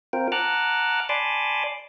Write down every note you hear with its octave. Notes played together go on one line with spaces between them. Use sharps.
C4 F4 A#4 G5
F#5 A5 A#5 D6 F6 F#6
D5 G#5 A5 B5 C6 D6